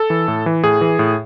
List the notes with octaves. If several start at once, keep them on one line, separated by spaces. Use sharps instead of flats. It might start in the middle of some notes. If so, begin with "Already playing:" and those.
Already playing: A4
E3
A2
E3
A2 G#4
E3
A2